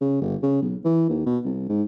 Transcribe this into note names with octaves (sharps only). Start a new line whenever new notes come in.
C#3
G1
C#3
B1
E3
D#2
B2
C2
G#2